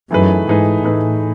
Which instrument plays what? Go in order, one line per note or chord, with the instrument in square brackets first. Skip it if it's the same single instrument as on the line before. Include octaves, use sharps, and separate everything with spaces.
[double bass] F#2 [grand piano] E3 A3 D#4 G#4 B4
[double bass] G#2 [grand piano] E3 A3 D#4 G#4 B4
[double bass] A2 [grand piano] E3 A3 D#4 G#4 B4